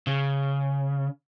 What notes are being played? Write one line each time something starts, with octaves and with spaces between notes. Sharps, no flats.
C#3